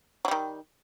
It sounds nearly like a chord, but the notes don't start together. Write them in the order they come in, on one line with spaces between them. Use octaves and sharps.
F#3 G3 D#3